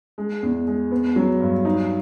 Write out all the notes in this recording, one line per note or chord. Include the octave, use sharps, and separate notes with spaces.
G#3
E2
G#3
B3
F#3
G2
D#4